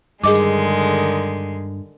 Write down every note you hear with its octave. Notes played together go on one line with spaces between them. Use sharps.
G2 D3 D#3 G#3 G#4 D#5 D6